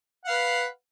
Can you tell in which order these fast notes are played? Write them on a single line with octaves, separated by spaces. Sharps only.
F#5 F5 B4